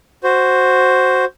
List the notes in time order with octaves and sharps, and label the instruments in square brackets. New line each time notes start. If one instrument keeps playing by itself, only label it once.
[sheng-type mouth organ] F#4 C5